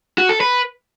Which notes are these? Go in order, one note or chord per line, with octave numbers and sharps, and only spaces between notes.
F#4
A4
B4